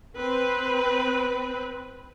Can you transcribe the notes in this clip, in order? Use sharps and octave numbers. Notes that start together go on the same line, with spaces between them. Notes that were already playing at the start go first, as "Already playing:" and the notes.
C4 B4